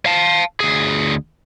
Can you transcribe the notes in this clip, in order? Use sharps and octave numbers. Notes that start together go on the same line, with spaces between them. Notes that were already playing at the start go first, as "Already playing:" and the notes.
F5 A5
D2 G#4